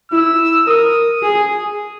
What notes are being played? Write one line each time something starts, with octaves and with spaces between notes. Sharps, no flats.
E4 E6
A#4 D#6
G#4